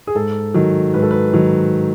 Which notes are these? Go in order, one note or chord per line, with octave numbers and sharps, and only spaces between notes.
G#4
G#2 A4
D#3 F#3
G#2 B4
A4
B4
D#3 F#3